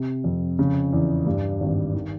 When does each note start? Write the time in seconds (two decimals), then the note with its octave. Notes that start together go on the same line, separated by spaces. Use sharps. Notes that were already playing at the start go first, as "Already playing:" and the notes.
Already playing: C3
0.24 F2
0.59 C#3
0.93 E2
1.26 G2
1.60 G#1
1.94 D#3